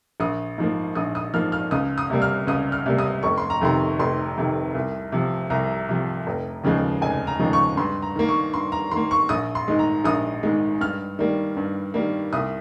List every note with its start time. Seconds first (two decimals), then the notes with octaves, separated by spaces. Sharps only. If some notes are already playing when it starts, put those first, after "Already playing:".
0.20 A#1 D#6
0.58 G#2 F3 A#3
0.95 A#1 D#6
1.15 D#6
1.34 G#2 F3 A#3 F6
1.52 F6
1.71 C#2 D#6
1.98 D#6
2.10 C3 G3 A#3
2.22 F6
2.47 C#2 D#6
2.72 F6
2.86 C3 G3 A#3
2.98 D#6
3.23 F1 C#6
3.38 C6
3.50 A#5
3.61 F2 C3 D#3 C6
3.99 F1 C6
4.37 F2 C3 D#3
4.75 C2
5.12 C3 F3
5.50 C2 A#5
5.89 C3 F3
6.27 F1
6.64 D#2 C#3 F3 G#3
7.02 F1 G#5
7.27 A#5
7.39 D#2 C#3 F3 G#3
7.53 C#6
7.77 G2 C6
8.02 A#5
8.16 D#3 A#3
8.29 C#6
8.54 G2 C6
8.72 A#5
8.91 D#3 A#3 C6
9.11 C#6
9.29 A#1 D#6
9.55 C6
9.68 G#2 D#3 G#3
9.79 A#5
10.04 A#1 D#6
10.43 G#2 D#3 G#3
10.81 G2 F6
11.19 D#3 G3 A#3
11.57 G2
11.94 D#3 G3 A#3
12.33 C2 D#6